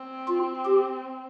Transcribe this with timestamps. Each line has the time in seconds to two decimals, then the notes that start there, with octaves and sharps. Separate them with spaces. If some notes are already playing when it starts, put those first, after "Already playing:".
Already playing: C4
0.28 F4
0.65 G4